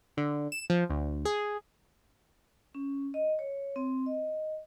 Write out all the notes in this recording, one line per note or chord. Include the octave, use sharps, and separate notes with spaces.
D3
E7
F3
D2
G#4
C#4
D#5
C#5
C4
D#5